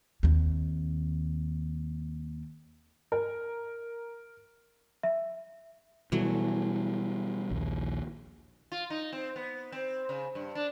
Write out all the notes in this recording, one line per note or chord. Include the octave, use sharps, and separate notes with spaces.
D#2 C4
A#4
E5
B2 E3 F#3 G3 A3
A#1 D#2
F4
D#4
C4
B3
C4
C#3
G2
D4